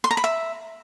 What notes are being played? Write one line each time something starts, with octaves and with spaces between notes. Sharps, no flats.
C6
A#5
B5
E5